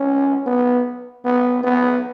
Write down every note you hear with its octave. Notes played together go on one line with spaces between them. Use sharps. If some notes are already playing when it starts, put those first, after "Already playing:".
Already playing: C#4
B3
B3
B3